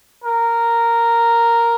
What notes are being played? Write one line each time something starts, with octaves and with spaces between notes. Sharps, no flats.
A#4